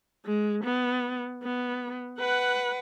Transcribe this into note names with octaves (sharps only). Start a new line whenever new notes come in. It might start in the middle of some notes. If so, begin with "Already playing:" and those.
G#3
B3
B3
B4 F#5